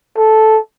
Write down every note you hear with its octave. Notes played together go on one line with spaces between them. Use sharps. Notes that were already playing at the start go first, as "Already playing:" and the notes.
A4